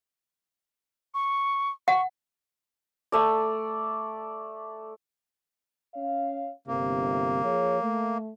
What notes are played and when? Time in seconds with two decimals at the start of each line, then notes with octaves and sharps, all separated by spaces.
1.14 C#6
1.88 F#5 C#6
3.12 A3 D5
5.95 C#4 C#5 F5
6.68 G1 C3 A#3
7.44 F3 G#4 C#5
7.82 A3